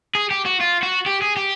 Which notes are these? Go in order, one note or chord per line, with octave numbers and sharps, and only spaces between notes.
G#4
G4
F#4
F4
F#4
G4
G#4
G4